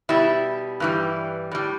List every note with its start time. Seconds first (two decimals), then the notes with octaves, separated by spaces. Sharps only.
0.09 B2 G3 E4
0.80 G2 E3 G3
1.51 A2 G3